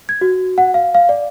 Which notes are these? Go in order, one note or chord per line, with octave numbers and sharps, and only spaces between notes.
G#6
F#4
F#5
F5
F5
D5